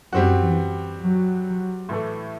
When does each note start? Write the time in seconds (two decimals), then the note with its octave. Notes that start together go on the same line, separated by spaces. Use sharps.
0.13 F#2 G3 C4 F#4
0.41 E3
1.01 F#3
1.89 A2 E3 A3